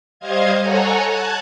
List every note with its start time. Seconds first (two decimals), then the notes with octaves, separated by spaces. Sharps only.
0.20 G3 C5 D#5 F5 G#6
0.60 A4 C#5 F#5 G#5 A#5
1.05 A5 F#6 G#6